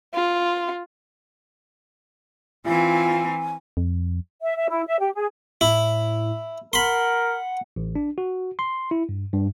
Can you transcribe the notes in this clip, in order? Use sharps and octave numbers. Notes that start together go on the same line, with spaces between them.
F4
E3 C4 F4 G#5
F2
E5
E5
E4
E5
G4
G#4
A2 E4
A#4 F#5 B5 C6
A1
D4
F#4
C6
E4
G2
G2